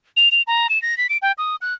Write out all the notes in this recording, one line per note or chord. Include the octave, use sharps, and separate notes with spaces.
F7
F7
A#5
E7
A#6
B6
D7
G5
D#6
F#6